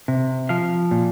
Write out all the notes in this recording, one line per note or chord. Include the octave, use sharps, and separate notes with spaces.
C3
F3 F5
A#2